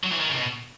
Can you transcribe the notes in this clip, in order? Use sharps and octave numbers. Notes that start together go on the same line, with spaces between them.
F#3
E3
D#3
C#3
B2